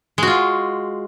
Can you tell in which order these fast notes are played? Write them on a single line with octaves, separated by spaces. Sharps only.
G#3 F#4 F4